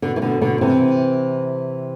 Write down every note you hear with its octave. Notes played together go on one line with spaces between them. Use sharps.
B2 D3
E3
B2 D3
B2 D3
C3 E3